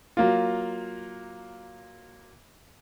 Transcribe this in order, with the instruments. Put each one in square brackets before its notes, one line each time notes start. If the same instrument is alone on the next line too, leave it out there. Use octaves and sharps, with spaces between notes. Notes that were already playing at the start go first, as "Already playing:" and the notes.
[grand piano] F#3 A#3 F4